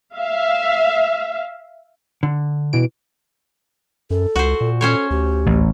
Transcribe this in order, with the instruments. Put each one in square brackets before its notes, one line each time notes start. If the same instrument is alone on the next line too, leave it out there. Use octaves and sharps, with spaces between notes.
[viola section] E5 F5
[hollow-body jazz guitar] D3
[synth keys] B2 E3 D7
[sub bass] F#2 [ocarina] A4
[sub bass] C#2 [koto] F#4 C5
[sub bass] A#2
[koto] C#4 C5 C#5 [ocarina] A4
[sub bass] D2 [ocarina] G4
[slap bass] A1